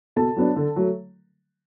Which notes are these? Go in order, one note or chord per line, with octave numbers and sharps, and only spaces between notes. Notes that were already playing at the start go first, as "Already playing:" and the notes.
B2 A4 A5
F#3 B3 D4
D3
F#3 A3